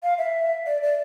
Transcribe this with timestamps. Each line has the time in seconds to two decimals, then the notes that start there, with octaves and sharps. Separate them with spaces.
0.03 F5
0.18 E5
0.67 D5
0.83 D5